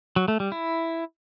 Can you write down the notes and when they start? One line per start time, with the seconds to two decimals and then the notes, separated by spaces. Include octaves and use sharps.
0.16 F#3
0.28 A3
0.40 G3
0.52 E4